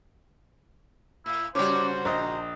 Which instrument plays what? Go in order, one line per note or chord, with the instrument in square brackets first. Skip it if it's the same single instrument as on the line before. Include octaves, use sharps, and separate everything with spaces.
[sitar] A2 [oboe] E4
[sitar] G#2 C#3 F#4 [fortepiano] G3 C#4 [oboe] C5 [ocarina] D6
[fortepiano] A#1 D#5 [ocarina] A#5